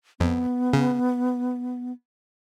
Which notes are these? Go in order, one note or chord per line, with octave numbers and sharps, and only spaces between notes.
F2 B3
C#3